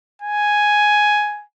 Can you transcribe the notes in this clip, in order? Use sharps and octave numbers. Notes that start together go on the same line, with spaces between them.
G#5